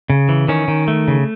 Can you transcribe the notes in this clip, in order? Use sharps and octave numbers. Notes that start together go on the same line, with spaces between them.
C#3
E3
D#3 C#4
D#3
A3
C#3